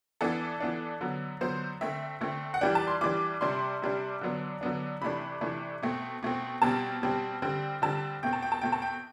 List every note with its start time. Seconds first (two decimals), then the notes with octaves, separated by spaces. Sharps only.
0.21 E3 B3 D4 A4
0.60 E3 B3 D4
1.01 D3 F#3 B3
1.41 D3 F#3 B3 C5
1.81 D3 A3 C4 E5
2.21 D3 A3 C4
2.54 F#5
2.61 E3 G3 D4 G5
2.75 A5
2.88 C6
3.01 E3 G3 D4 D6
3.41 C3 G3 D4 C6
3.82 C3 G3 D4
4.21 D3 F#3 B3 D4
4.61 D3 F#3 B3 D4
5.01 C3 E3 A3 D4 B5
5.41 C3 E3 A3 D4
5.82 B2 A3 C4
6.23 B2 A3 C4
6.62 B2 G3 C4 A5
7.02 B2 G3 C4
7.42 D3 G3 C4
7.82 D3 G3 C4 A5
8.23 B2 A3 C4 G5
8.33 A5
8.42 G5
8.52 A5
8.61 B2 A3 C4 G5
8.72 A5
8.82 G5